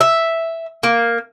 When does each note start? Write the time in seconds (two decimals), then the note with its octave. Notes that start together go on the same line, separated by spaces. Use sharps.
0.01 E5
0.83 A#3